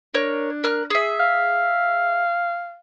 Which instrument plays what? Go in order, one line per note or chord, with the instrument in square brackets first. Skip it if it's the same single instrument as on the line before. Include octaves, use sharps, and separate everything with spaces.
[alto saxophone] D4 [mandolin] A#4 C#5
[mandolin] A#4 F6 F#6
G#4 E5
[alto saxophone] F5